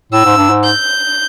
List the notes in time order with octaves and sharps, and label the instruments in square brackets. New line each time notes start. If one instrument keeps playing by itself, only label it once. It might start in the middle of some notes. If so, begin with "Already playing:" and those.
[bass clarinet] A2 [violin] E6
[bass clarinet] G#2
G2
G#2
[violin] G6